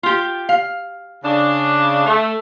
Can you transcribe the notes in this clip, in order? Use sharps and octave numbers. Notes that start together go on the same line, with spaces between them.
F4 G4
F5
C#3 D4
A3